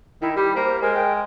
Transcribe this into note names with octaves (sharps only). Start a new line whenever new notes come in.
D#3 E4
G3 G4
A#3 C5
G#3 A#4
G5